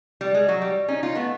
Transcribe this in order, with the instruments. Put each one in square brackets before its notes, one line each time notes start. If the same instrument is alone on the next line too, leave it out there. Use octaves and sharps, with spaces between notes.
[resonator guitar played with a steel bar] G3
G#3
F#3
G3
C#4 D#4
D#4 F4
A3 B3